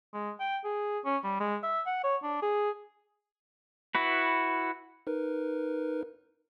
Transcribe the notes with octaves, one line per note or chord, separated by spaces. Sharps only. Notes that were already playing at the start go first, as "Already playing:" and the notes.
G#3
G5
G#4
C#4
G3
G#3
E5
F#5
C#5
D4
G#4
E4 F#4 B4
D#4 A#4 B4